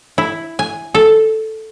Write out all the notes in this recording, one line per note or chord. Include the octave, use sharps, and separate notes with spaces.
E4
G#5
A4